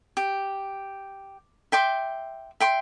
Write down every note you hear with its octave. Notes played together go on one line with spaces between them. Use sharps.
G4
E5 G5 C6 D6
E5 G5 C6